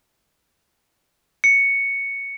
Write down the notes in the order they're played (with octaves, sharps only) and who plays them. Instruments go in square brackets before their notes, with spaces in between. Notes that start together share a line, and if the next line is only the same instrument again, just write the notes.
[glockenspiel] C#7